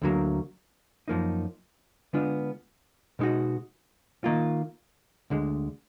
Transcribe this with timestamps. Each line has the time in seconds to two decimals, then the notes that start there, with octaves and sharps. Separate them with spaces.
0.02 D2 D3 F#3 A#3
1.08 F#2 F3 A#3 D#4
2.13 D3 G#3 B3 D4 F4
3.19 B2 G#3 D#4 F#4
4.24 D#3 A#3 F4
5.30 D2 D3 G#3